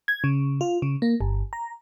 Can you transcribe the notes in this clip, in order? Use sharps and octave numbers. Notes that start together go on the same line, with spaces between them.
G#6
C#3
F4
C#3
A#3
G1
A#5